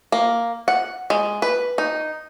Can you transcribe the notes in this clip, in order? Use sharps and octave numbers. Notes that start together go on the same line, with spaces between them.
A#3
F#5
G#3
B4
D#4